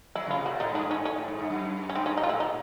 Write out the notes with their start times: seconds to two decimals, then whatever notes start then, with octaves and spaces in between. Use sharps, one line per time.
0.15 F#3 E4
0.27 C#3 F4
0.38 C3
0.46 A#2 F#4
0.60 A2 D#4
0.72 G2 D4
0.83 G#2
0.91 A2 C#4
1.05 C#4
1.17 A2
1.28 G#2
1.39 G2
1.50 F#2
1.89 C#4
1.95 G2 C4
2.06 G#2 C#4
2.18 G#2 D#4
2.23 A#2 F4
2.29 A2 E4
2.40 A#2 D#4